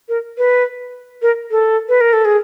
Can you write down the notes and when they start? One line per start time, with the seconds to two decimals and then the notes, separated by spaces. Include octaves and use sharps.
0.09 A#4
0.38 B4
1.22 A#4
1.51 A4
1.89 B4
2.01 A#4
2.13 A4
2.25 G#4